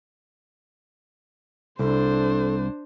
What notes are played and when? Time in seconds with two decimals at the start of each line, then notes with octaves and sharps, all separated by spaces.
1.79 C2 D4 A4 C5